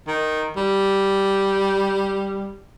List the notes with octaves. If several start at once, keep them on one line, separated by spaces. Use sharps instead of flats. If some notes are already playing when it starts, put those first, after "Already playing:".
D#3
G3